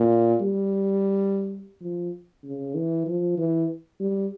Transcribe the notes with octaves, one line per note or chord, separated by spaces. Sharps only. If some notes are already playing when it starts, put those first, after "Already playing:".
Already playing: A#2
G3
F3
C#3
E3
F3
E3
G3